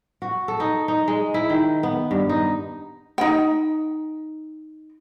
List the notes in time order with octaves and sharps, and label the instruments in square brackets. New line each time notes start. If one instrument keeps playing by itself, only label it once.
[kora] F#4
A4
D#4
D#4
G#3
E4
D#3
B3
G2
D#4
[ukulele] D#4 G5